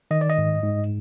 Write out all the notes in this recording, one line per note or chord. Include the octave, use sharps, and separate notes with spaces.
D#3 D#5
D5
D#5
G#2
G#2